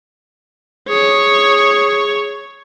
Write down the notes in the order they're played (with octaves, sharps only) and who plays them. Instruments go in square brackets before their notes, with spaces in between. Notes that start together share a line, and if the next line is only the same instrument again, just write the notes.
[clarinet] G#4 [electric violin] C#5